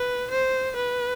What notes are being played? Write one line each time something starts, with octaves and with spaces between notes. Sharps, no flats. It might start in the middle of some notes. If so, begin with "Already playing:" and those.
Already playing: B4
C5
B4